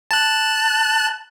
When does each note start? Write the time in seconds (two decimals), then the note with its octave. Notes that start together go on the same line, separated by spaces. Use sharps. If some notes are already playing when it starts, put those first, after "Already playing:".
0.11 A5 F#6